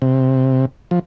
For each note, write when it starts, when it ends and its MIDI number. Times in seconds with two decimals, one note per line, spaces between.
0.02 0.65 48
0.91 0.99 53